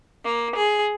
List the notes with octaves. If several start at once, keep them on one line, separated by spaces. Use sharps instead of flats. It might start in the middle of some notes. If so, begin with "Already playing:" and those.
A#3
G#4